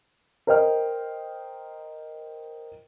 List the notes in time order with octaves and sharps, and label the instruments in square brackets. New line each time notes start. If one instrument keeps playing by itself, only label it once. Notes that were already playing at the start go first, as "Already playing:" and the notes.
[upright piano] A#4 C5 D#5 G5 F6